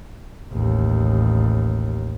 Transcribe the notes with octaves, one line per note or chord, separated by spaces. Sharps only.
A1 D#2